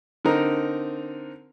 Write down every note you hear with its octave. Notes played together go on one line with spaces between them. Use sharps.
D3 C4 D#4 A#4